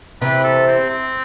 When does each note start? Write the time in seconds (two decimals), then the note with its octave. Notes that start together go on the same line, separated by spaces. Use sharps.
0.21 C3 E3 B4
0.44 A4
0.67 C4
0.90 C4